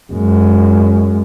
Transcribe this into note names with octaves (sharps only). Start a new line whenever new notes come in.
F#2 G#3